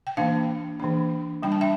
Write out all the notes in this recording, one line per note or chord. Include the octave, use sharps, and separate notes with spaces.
G5
E3 A#3 D4 F5 A5
E3 A#3 D4
G3 D4 G5
A5
E5 G5